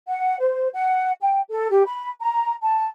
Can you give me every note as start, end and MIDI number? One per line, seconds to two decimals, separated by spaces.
0.07 0.35 78
0.39 0.68 72
0.73 1.11 78
1.20 1.41 79
1.49 1.69 69
1.70 1.83 67
1.87 2.08 83
2.21 2.51 82
2.62 2.87 81